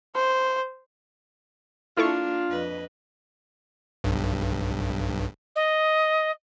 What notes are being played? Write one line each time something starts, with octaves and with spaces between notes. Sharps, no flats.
C5
A#3 D4 E4 F4 A4 C#6
F2 B4 D#5
B1 G2
D#5